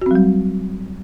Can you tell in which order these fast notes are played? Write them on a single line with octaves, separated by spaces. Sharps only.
F#4 C4 F#3 G3